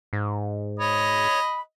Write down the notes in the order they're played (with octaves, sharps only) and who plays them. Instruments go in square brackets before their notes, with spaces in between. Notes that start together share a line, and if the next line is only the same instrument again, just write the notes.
[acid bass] G#2
[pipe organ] C#5 [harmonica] D#5 [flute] B5